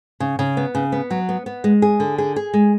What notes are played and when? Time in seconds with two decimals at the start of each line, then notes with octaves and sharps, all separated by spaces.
0.20 C#3
0.39 C#3
0.57 B3
0.75 C#3
0.92 B3
1.10 F#3
1.29 B3
1.46 B3
1.64 G#3
1.82 G#4
2.00 D3
2.18 G#4
2.36 G#4
2.54 G#3